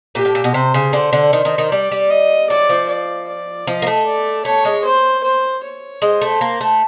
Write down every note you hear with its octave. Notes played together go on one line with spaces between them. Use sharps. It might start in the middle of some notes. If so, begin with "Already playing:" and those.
A#2 G4
A2
A#2
B2
C3 C5
C#3
D3 C5
D3
D#3 C5
D#3
D#3
G3 D5
G3
D#5
F#3 D5
F3
D5
D5
F3 D#5
A#3
A3
D5
A3 C#5
G#3
C5
C5
C#5
G#3 C5
A3
A#3
A3